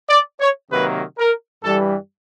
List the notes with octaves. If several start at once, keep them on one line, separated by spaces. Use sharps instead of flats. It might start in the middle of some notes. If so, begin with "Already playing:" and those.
D5
C#5
C3 D#3 F#3 A#3 B4
A#4
G2 E3 G3 A4